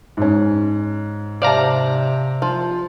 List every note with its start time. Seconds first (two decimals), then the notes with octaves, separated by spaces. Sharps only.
0.17 G#2 C#4
1.42 C3 C5 D5 F5 A5 A#5
2.42 F3